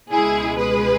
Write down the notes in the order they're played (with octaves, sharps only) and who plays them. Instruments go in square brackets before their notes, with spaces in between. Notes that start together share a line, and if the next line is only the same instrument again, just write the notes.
[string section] C#2 B2 G#3 E4 G#4
G#4 B4